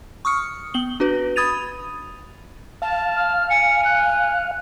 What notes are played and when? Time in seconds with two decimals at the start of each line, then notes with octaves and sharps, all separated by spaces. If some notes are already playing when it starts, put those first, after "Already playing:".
0.25 C#6 D#6 F6 C#7
0.74 B3 F#7 G7
1.00 D4 F#4 B4
1.36 B5 D#6 G#6 A6 D#7 F7
2.82 F5 A5
3.16 F6
3.50 G#5 C#7
3.85 F#6